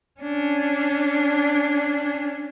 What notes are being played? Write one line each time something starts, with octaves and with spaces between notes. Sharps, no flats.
C#4 D4